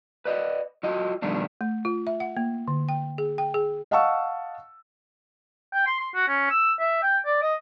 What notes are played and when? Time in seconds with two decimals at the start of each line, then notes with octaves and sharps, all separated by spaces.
0.25 B4 D5 D#5
0.83 F#3 F4 D#5
1.22 F2 B2 D#3 G3 A3 D4
1.61 A3
1.85 F4
2.07 E5
2.20 F#5
2.37 A#3
2.68 D3
2.89 G5
3.18 G#4
3.38 G5
3.54 G#4
3.91 D#5 F5 F#5 A5 C#6 E6
5.73 G5
5.87 C6
6.00 C6
6.15 F#4
6.28 C#4
6.50 E6
6.80 E5
7.03 G5
7.26 D5
7.42 D#5